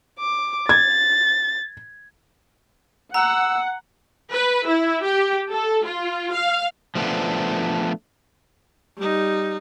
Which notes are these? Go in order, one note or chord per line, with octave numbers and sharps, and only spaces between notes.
D6
G#6 A6
F#5 A#5 E6
B4
E4
G4
A4
F4
F5
F3 A3 B3 D4
G3 D#4